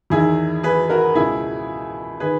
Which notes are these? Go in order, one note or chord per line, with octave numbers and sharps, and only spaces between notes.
E2 D#3 E4 G#4
G#4 B4
F#4 A#4
C#2 B2 E4 G#4
D#3 G#4 B4